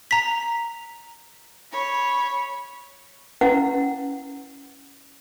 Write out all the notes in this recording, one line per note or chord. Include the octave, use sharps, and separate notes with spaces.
A#5 B6
C#5 B5
C#4 E4 B4 F5 F#5